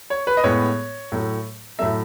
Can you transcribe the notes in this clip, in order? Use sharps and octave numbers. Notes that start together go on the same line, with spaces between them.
C#5
B4
D#5
A2 G#3 B3 C#5
A2 F#3 A3
A2 F#3 A3 E5